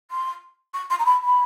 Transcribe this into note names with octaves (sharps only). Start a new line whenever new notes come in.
C6
C#6
C6
A#5
B5
B5